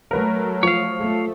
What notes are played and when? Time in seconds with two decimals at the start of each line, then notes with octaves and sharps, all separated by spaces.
0.11 F#3 A3 A#4 B4
0.63 F3 C#5 F5
0.99 A3